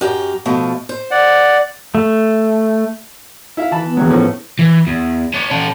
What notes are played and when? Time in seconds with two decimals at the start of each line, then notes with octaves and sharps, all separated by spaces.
0.01 F#2 G4 A#5
0.45 B2 F3 A3
0.89 C5
1.11 D5 F#5
1.95 A3
3.57 E4 E5 F5
3.71 E3 A5 B5
3.84 B3
3.97 E2 G2 F#3
4.10 A2 F3 C#4
4.59 E3
4.87 E2
5.34 C#4 A5
5.51 C#4 A4